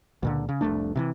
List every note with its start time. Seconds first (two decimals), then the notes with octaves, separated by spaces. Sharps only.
0.23 C#2 A#2 D3
0.49 C#3
0.61 F1 C2 A3 D4
0.95 C3 D#3 E3